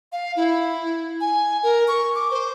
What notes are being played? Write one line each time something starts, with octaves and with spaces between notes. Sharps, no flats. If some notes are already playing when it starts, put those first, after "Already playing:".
F5
E4
G#5
A#4
C#6
D6
C5